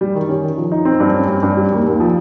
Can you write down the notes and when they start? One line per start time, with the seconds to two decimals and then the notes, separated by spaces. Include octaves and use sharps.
0.01 G3
0.15 D#3
0.29 C#4
0.43 D#3
0.57 F3
0.72 D#4
0.85 C4
1.00 G2
1.15 C#4
1.28 G2
1.43 G2
1.57 G3
1.71 D#2
1.86 D#2
2.00 F3